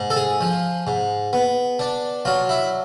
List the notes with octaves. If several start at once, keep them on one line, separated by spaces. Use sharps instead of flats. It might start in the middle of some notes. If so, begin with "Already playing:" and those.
Already playing: G#2
A4
G#4
F3
G#2
B3
D4
F#3 F4
E4